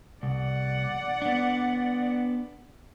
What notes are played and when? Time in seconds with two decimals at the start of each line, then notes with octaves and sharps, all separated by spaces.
0.23 C2 D5 F#5
1.22 B3 D4